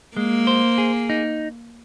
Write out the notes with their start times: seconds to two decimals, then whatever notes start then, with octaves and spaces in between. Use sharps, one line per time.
0.17 G#3 A#3
0.47 C5
0.78 G#4
1.10 D#4